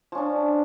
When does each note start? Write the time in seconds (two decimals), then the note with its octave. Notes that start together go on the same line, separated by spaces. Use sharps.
0.12 F3
0.15 C#4
0.18 D4